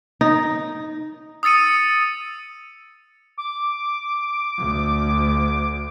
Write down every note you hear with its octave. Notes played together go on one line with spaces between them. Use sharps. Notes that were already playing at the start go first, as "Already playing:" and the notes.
D#4
D#6 E6 A6 C#7 D#7
D6
D2